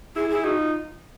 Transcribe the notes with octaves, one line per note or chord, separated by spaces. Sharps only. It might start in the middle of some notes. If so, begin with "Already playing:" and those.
E4 G#4
E4 G#4
D#4 F#4
F4